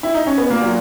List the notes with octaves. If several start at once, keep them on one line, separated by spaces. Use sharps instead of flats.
E4
D#4
C#4
B3
A#2 A#3
F#3